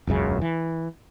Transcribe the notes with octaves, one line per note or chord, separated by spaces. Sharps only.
E1 C#2 F#2 C#3
E3